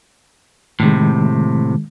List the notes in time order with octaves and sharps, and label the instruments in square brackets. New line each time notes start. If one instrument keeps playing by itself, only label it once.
[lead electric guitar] A2 C3 [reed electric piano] D#3 G#3